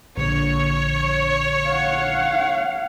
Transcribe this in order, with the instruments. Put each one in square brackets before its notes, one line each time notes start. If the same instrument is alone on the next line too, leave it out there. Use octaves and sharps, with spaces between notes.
[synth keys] A#1 D3 [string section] C#5
[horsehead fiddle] F5 F#5